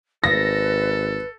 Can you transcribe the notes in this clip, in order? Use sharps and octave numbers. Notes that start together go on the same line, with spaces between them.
G#1 A4 B4 A#6